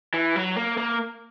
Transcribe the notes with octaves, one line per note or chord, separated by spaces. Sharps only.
E3
F#3
A#3
A#3